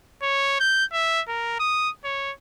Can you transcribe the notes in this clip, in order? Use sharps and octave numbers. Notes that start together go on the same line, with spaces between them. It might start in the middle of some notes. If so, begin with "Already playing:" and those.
C#5
G6
E5
A#4
D#6
C#5